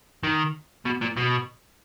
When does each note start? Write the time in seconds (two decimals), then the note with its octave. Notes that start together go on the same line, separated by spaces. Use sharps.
0.23 D#3
0.85 B2
1.01 A#2
1.17 B2